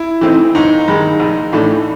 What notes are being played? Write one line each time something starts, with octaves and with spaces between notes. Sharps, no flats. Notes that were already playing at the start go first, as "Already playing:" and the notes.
Already playing: E4
E3 A3 C4 D#4
G1 D#4
G2 D#3 G#3
A#1
A2 E3 A3 D4